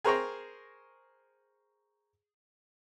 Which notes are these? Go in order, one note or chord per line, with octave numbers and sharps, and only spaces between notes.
G#4 A#4 C5 C#5 G5 A#5